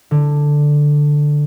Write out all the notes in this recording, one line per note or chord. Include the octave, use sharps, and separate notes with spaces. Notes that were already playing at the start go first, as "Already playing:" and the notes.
D3